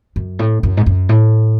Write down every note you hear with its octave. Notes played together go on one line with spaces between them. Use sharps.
F#2
A2
F#2
G#2
F#2
A2